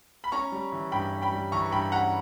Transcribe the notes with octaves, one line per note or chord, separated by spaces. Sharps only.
B5
C#4 A#5 C#6
G3
E3
G2 G5 B5
C#4
G5 B5
G3
E3 A#5 C#6
C#6
G2 G5 B5
C#4 F#5 A#5